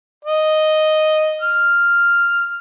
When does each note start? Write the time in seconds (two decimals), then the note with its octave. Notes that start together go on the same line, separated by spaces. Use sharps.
0.25 D#5
1.42 F6